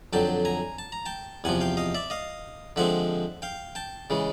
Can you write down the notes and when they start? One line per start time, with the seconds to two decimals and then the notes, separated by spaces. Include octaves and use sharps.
0.13 F2 D3 F#3 G5 A5
0.45 G#5 A#5
0.79 A5
0.92 A#5
1.06 G5 A5
1.44 E2 C3 F3 F#5 G#5
1.61 F5 G5
1.77 D#5 F5
1.95 D5 E5
2.10 D#5 F5
2.76 D3 F3 G#3 C4 E5 F#5
3.42 F5 G5
3.75 G5 A5
4.10 C#3 E3 G#3